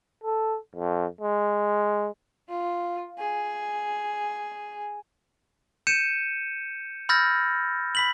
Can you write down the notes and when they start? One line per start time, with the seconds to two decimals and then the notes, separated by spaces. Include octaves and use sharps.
0.24 A4
0.76 F2
1.21 G#3
2.49 F4
3.19 G#4
5.87 G6 C#7 D#7 E7
7.09 B5 E6 F6 G6 A6 A#6
7.95 B5 B6 F#7